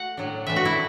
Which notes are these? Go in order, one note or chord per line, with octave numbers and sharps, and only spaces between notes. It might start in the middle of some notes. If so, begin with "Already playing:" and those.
Already playing: A3 F#4 F#5
A2 F#3 D4
E3 A3 D4 E5
F#4
E4